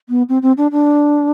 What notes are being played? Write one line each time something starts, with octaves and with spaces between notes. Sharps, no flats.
B3
C4
C4
D4
D4